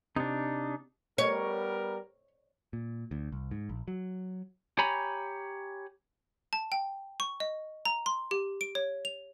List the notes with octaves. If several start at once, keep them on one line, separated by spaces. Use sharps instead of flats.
C3 D4 D#4
G3 B3 A#4 C#5
A#2
D2
C2
G#2
A#1
F#3
G4 C#5 G#5 A#5 B5
A5
G5
C#6
D#5
A#5
C6
G4
D7
C#5
F7